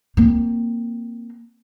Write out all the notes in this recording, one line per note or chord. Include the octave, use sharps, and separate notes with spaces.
A#3 C4